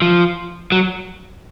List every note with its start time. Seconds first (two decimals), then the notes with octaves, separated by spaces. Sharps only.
0.02 F3
0.72 F#3